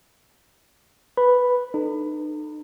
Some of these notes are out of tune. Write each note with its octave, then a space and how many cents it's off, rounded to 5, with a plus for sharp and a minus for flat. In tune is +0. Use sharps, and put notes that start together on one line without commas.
B4 +0 B5 +0
D#4 -40 A4 +0